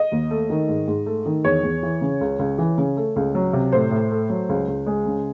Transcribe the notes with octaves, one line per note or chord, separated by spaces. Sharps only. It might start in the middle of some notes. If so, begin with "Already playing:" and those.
Already playing: D#5
D#2
A3
D#3
G#2
G#2
A3
D#3
E2 C#5
E2
E3
C#3
C#2
C#2
E3
C#3
A3
C#2
F#3
C3
A2 C5
A2
A3
F#3
C#2
C#2
G#3
C#3